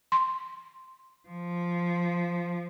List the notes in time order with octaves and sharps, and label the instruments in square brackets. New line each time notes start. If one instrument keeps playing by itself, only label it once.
[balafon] C6
[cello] F3